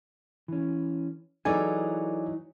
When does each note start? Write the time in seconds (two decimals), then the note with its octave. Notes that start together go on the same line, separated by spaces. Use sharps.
0.48 E3 C#4
1.45 E3 F#3 D#4 G#4 A4 B4 D5 G#5